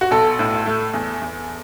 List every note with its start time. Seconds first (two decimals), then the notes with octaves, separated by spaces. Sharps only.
0.01 F#4
0.11 B1 A4
0.39 A2
0.66 A3
0.94 E2
1.22 E2